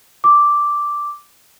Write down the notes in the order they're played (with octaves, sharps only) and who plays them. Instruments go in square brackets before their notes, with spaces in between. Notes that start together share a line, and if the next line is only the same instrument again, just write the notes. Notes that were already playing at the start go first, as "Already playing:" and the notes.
[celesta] D6